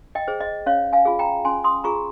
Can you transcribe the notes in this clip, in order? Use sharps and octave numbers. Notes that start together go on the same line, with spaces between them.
D#5 G5
G#4 C5
D#5
C#4 C#5 F5
F5 G#5
F4 G#4
G5 A#5
C#4 G#5 C6
C6 D#6
F4 G#4 A#5 C#6